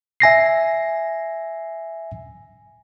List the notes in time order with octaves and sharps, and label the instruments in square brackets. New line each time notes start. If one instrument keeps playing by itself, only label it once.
[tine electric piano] E5 G#5 A#6 C7